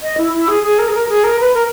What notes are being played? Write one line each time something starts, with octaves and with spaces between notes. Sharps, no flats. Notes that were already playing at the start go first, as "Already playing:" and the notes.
D#5
E4
E4
G#4
G#4
A#4
G#4
A#4
G#4
A#4
B4
A#4